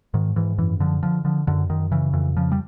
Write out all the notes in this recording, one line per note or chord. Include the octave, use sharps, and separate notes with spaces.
G#2 D#3
G#2 E3
F#2 E3
D3 F3
D3 F3
D3 F3
F#2 D3
F#2 D#3
C#3 E3
F2 E3
C#3 F3
G3